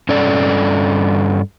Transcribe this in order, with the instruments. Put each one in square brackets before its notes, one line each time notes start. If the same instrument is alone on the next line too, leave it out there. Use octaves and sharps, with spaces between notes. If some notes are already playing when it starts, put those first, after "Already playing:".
[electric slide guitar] G2 C#4 A4 D5